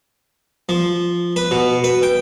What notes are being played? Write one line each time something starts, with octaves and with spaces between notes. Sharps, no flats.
F3
B4
B2
B4
G5